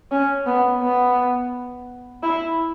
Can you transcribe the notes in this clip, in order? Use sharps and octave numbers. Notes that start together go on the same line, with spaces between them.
C#4
B3
B3
E4